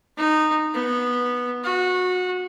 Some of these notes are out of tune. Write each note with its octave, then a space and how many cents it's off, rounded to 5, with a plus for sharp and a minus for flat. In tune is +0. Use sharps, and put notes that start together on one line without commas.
D#4 -15
B3 -10
F#4 -20